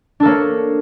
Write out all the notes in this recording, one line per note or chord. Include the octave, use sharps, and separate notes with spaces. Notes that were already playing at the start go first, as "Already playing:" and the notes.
A#3 D4 A4 C#5